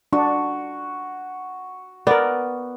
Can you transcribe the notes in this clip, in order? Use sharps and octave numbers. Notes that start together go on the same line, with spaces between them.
D4 F#4
B3 A#4 D5